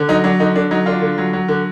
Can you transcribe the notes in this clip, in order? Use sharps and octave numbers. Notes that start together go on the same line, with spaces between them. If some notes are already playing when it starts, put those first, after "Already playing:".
Already playing: D3
F#3 D#4
F#3 D4
D3 D#4
D3 D4
F#3 D#4
D3 D4 F4
D3
F#3
F#3
D3